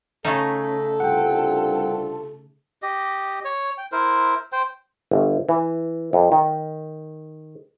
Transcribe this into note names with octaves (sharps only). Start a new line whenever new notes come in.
C#3 A3 D#4 A4 D#5 E5
C2 G2 F4 F#5 G5
G4 D#5
C#5
G5
E4 A#4 C5
C5 G5
G1
E3
F2
D#3